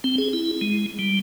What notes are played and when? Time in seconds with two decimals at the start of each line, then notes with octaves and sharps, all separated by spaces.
0.04 C4
0.18 G#4
0.33 E4
0.61 G#3
0.99 G3